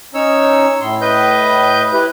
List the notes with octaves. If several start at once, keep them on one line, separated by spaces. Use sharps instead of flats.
C#4 D#4 C#5 E6
A2 C6
B4 D#5 G6
E4 G4 B4